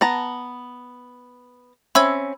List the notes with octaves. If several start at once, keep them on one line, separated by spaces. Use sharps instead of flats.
B3 A5 A#5
C4 C#4 E5 B5 E6 G#6